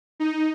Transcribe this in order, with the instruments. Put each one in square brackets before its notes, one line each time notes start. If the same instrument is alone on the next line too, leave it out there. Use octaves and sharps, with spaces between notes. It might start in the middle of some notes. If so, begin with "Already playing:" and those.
[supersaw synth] D#4